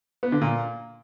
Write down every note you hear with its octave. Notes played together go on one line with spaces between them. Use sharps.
B3
D3
A#2